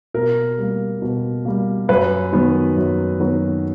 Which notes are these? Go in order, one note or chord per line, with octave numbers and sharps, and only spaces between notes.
B2 A#4
G3 A#3
B2
G3 A#3
F#2 B4
D#3 F#3 B3
F#2
D#3 F#3 B3